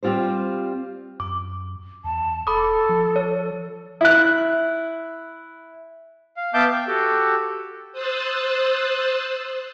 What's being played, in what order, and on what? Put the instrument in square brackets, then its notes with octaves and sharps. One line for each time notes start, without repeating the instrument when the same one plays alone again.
[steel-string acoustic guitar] G3 C4 F4 G4 C5
[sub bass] F#2 [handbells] D6
[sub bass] E2 [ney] A5
[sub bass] D#1 [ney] A4 [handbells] B5 D6 D#6
[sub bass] F3
[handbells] C#5
[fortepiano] E4 F#6
[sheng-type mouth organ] F5
B3 E5 F5 A5 D6 G6
G5
F#4 G4 A4
[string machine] C5 D#6 E6 F#6 A6